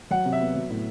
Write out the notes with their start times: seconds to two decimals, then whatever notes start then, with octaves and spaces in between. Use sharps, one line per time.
0.10 F#3 F#5
0.25 C3
0.33 E5
0.41 B3
0.55 F#3
0.70 A2